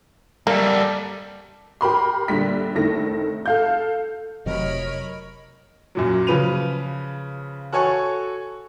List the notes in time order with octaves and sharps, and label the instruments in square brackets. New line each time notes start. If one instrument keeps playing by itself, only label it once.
[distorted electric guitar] G3 A4 [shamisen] A#3
[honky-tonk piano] G4 A#4 B5 C6
A#1 D3 G3 B6
F1 D3 D#3 E4 A4 A#6
A4 F5 G6
[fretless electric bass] F1 C3 F#3 [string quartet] A#4 C#5 B5 [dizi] D#5
[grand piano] F#2 A#2 F#3
C#3 F3 B4 D#7 F7
F#4 A4 C#5 G#5 A5 C#6